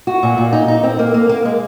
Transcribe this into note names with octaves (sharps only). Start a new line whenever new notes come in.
F#4
A#2
A#2
D#4
D#4
C4
A#3
A#3
A#3
G#3